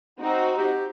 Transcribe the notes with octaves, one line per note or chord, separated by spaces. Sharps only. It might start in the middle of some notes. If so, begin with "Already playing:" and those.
C4 D#4 F#4
G4